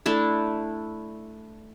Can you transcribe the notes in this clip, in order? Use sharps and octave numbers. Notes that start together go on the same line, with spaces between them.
A3 D4 E4